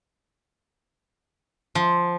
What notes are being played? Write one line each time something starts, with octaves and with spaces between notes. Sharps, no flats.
F3